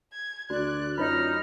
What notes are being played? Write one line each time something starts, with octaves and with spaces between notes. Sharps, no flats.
G#6
D2 F#4 D5 F#6
F#2 D#4 F4 C#5 D#5 F6